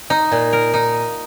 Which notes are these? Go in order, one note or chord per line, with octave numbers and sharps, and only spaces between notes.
D#4
A#2
A#4
D#4